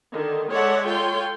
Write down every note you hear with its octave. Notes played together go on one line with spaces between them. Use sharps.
D3 D#3
G#3 A4 C#5 D5 E5 F#5
F4 A4 C#5 G5 C6